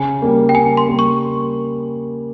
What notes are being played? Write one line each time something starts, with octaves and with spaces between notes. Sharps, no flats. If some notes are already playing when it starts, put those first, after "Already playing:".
Already playing: C#3 G#5
G3 A#3
G5
C#3 G#5
C6
G3 A#3
C#6